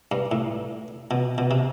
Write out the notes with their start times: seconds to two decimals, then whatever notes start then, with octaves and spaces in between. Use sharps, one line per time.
0.12 G2
0.32 A2
1.11 B2
1.38 B2
1.51 C3